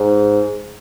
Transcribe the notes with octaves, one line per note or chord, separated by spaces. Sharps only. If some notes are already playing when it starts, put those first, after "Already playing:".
Already playing: G#2